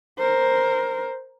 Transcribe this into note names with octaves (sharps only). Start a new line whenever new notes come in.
A#4 C5